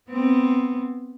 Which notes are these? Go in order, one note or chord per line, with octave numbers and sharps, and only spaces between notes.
B3 C4